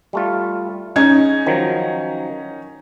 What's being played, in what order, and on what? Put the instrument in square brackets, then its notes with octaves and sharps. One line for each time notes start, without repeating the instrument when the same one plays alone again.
[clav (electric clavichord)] G3 A3 F4
[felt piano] C#4 D#4 G#6 [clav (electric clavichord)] G#4
[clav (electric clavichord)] D#3 F3 F#3